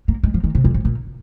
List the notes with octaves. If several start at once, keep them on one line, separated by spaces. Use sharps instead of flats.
A#3
G#3
F3
D#3
C3
F2
G#2
A#2